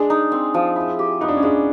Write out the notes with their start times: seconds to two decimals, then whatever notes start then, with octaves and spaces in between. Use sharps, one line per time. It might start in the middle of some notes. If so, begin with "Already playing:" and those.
Already playing: G#3 D4
0.10 D#4
0.32 C4
0.54 F3
0.76 E4
0.99 G4
1.21 B3 D#4
1.28 D4
1.37 C#4
1.43 G#3 D4